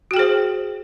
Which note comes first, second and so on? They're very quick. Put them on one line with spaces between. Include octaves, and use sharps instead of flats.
F#4 G5 G#4 C5